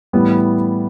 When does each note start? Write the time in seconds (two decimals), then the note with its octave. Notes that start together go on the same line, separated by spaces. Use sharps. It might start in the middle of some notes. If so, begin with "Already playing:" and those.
0.13 A2 E3 G3 B3